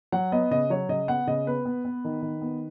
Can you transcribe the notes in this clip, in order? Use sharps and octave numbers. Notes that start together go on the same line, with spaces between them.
F#3 F#5
B3 D#5
C#3 D#5
F#3 C#5
C#3 D#5
B3 F#5
C#3 D#5
B3 B4
B3
B3
D#3
D#3
B3